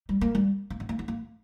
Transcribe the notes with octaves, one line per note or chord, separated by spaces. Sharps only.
G3
A#3
G3
A#3
B3
A#3
B3
A#3